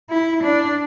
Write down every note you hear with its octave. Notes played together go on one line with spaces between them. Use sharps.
E4
D4